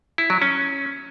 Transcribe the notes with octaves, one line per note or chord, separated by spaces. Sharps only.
E4
F#3
C#4